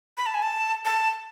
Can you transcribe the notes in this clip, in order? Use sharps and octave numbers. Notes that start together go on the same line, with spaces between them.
B5
A5
G#5
A5
A5